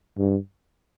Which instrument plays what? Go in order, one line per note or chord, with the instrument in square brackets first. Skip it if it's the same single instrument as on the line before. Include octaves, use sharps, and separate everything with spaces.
[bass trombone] G2